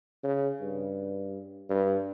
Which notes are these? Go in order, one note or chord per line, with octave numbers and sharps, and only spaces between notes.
C#3
G2
G2